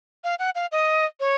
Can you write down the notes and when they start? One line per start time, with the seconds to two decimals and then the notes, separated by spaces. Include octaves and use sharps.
0.24 F5
0.39 F#5
0.55 F5
0.72 D#5
1.20 C#5